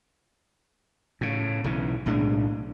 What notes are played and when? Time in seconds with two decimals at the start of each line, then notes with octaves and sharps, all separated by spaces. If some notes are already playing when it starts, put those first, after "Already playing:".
1.21 A2 C#3
1.64 B1 C#3 E3
2.06 B1 A2 G#3 D4